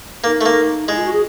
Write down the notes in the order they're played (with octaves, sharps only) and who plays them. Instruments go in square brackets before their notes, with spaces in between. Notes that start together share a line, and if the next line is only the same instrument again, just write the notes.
[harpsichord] A#3 [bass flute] D#4
[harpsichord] A3
A#3
[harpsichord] G#3 [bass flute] E4
[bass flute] F4
F#4
G#4